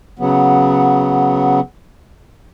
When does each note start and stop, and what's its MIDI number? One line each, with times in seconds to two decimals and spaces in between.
0.19 1.60 49
0.19 1.60 54
0.19 1.60 59